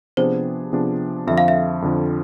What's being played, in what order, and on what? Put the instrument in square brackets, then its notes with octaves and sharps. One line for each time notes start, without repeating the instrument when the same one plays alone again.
[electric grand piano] C3 F3 B3 D4 G#4 [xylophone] C5
[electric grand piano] C3 F3 B3 D4 G#4
[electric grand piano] F2 D3 F3 [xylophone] E5
[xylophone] F5
E5
[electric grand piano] F2 D3 F3